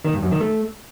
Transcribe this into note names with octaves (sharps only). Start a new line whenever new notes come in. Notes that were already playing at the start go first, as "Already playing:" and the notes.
D#3
G2
F#2
D#3
A3